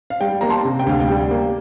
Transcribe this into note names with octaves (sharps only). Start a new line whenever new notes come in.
F5
G3 G5
A#3 A#5
A5 C6
C3
G5
D2 F5
G5
G3
A#3